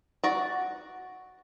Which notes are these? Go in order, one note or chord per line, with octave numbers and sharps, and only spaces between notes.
F#4 D5